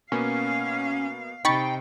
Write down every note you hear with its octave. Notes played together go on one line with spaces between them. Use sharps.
B2 A#3 B3 C#4 F5
C3 D#4 G5 B5 C#6 A6